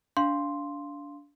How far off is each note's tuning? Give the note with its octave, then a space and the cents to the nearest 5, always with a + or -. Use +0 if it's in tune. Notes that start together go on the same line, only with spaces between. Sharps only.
D4 -25 F5 -5 C6 +0